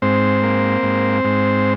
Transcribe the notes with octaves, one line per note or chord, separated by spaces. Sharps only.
G#2 C4 C5
A#3
G#2
G#2